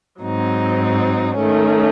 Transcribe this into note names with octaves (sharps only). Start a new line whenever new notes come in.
G#2 F#3 C4 D#4
D#3 A3 C#4